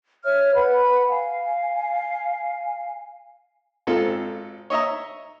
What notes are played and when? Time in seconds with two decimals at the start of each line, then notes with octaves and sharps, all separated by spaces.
0.24 C#5 E5 F6
0.54 B4 F#5 B5
1.10 F5 G#5
3.87 G#1 G#2 C4 F4 A4
4.70 C#5 D#5 E5 A#5